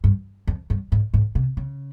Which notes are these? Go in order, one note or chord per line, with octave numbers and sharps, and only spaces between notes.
G2
F2
G2
G#2
G#2
C3
C#3